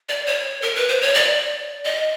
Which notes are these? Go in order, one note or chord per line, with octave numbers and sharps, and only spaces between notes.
D5
C#5
A#4
B4
C5
C#5
D5
D#5